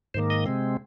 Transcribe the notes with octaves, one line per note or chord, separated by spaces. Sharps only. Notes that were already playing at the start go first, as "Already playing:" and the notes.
G#2 D#3 A#3 C5
D#5
C3 G#3 C4